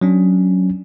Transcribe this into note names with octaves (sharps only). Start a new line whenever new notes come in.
F#3 C#4 D4